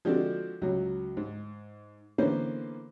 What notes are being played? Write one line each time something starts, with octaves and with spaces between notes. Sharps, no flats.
F3 G#3 C4 D4 F#4 A4
C#2 F#3
G#2
D3 E3 A#3 B3 C#4 C5